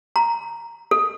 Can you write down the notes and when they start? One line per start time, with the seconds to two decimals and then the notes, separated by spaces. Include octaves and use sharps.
0.16 A#5
0.91 A4